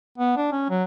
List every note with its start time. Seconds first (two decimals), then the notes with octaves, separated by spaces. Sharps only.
0.18 B3
0.37 D4
0.52 C#4
0.70 F#3